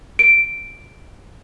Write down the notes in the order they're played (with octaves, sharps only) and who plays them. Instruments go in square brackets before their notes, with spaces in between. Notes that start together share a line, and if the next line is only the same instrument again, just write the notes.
[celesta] D7